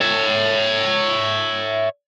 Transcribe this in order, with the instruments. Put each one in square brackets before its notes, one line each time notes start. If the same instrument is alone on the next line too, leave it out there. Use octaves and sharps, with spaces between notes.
[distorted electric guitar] C#5 E5